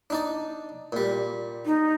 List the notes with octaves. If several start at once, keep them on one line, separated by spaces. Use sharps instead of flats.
D4 D#4 D5
A#2 G3
D#4